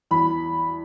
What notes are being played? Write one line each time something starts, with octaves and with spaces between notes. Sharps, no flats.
E2 B5